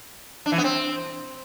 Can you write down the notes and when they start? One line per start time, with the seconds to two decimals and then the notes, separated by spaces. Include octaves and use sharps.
0.46 D4
0.52 E3
0.58 B3
0.64 C4